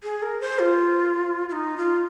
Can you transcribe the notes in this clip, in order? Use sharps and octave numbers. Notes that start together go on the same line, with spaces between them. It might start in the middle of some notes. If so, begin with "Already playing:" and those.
G#4
A#4
C5
F4
F4
D#4
F4